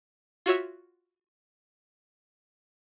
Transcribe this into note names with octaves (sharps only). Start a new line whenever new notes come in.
F4 F#4 C#5 E5